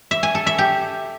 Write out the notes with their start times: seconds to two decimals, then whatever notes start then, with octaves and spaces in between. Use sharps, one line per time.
0.11 E5
0.23 G#5
0.35 A4
0.47 E5
0.58 G4